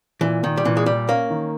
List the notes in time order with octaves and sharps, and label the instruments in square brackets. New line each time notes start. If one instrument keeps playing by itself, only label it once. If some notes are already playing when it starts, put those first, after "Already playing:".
[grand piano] A#2 [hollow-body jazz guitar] E3
[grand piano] A#2 [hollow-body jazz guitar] D#3
[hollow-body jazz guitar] G3
[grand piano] A#2 [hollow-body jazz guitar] E3
[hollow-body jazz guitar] G#3
[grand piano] A#2 [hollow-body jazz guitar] G3
[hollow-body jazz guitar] A#3 [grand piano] C#4
[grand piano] D#3